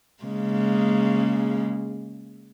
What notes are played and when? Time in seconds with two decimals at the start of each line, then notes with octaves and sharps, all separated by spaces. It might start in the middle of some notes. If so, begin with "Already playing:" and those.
0.23 C#3 G#3 A#3